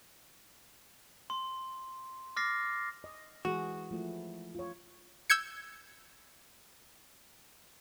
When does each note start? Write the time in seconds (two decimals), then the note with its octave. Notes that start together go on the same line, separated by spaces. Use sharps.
1.30 C6
2.37 D6 F6 A6 A#6 C7
3.04 D#5
3.45 E3 G#3 F#4 G#4
3.91 F3 A3 E4
4.55 F4 C#5
5.30 E6 G6 G#6 C#7